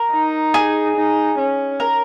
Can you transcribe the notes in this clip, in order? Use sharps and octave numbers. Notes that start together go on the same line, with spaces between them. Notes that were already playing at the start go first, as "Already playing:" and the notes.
Already playing: A#4
D#4
G#4
D#4
C#4
A#4